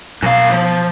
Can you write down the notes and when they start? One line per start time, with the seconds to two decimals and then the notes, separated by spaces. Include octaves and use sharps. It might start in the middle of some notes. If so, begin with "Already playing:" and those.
0.22 F#2 B2 F5
0.52 F3